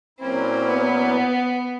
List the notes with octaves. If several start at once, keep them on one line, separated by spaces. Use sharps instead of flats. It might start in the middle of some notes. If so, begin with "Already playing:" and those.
A#2 F#3 A#3 C4 C#4 E4
B3